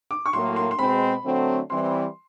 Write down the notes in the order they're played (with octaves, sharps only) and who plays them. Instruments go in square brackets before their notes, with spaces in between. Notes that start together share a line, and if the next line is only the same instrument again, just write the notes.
[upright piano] D6
C#6
[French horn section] A2 F#3 A#3 [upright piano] C6
[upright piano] C6
C6
[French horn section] B2 G#3 C4 [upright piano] B5
[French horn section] D3 F#3 A3 C4
[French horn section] E3 G3 C4 [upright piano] C6